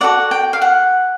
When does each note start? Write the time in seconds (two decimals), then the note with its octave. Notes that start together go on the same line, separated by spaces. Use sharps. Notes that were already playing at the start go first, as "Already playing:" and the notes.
0.01 F#4 A4 D5 F#5
0.31 G5
0.53 F5
0.62 F#5